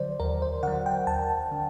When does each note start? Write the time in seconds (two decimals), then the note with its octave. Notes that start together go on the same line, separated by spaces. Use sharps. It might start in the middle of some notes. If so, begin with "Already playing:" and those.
Already playing: D3 F#3 C5 D5
0.20 D#2 A#4
0.42 C5
0.63 D3 F#5
0.68 F#3
0.86 G5
1.07 D#2 A5
1.52 D3